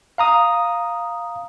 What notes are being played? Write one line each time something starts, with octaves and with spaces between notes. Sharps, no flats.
F5 A#5 D#6